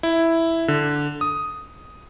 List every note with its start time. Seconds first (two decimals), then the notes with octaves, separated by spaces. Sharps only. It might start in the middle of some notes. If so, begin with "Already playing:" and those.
0.03 E4
0.68 D3
1.21 D#6